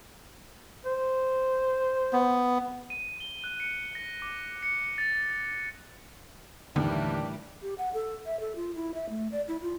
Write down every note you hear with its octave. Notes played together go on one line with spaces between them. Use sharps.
C5
B3
D#7
G7
F#6
C#7
A#6
D6
C#7
A6
A6
D#2 A2 D3 E3 G3 D4
G4
F#5
A4
E5
A4
F4
E4
E5
A3
D5
E4
F4